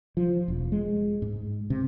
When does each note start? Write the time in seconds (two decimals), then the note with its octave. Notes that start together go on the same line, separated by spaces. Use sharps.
0.17 F3
0.48 E1
0.72 G#3
1.22 G#2
1.70 C3